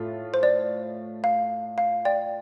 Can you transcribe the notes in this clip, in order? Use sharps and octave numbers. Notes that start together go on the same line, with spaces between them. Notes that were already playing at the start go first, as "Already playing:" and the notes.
Already playing: A2 A3 F4
C5
D5
F5
F5
D5 G5